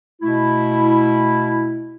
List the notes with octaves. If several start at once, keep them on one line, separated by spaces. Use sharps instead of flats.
B2 A3 E4